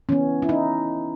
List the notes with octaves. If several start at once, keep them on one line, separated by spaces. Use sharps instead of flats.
E3 B3 C#4
E4
D#4